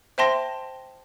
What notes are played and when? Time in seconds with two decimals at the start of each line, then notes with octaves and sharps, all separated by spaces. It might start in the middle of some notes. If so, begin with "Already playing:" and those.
0.18 C5 E5 G5 A5 C6 A#6